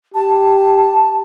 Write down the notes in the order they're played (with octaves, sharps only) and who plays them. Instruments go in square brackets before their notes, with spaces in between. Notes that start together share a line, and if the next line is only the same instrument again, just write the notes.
[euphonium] G4 [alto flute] A5